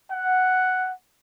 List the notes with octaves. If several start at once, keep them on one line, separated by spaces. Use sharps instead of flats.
F#5